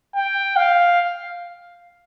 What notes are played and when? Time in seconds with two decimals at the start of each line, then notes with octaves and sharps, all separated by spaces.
0.15 G5
0.56 F5